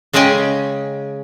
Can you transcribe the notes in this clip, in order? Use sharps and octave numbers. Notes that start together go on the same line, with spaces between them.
C#3 G#3 C#4 D#5 G5 G#5